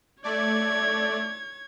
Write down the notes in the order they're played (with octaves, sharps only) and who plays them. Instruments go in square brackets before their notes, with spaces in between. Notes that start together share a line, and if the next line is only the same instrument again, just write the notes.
[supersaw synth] A3 D5 [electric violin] C#5 G#6